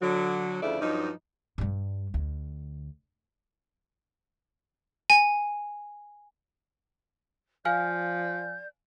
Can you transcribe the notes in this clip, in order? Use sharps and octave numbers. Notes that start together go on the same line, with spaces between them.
D3 F#3
D2 C#3 F3 E4 A4 D5
G2 F3 F#3 D#4
G2 G3
D2
G#5
F3 D5 F5 G#5 F6 G6